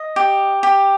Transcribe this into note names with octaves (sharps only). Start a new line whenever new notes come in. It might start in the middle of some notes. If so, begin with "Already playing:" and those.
Already playing: D#5
G4
G4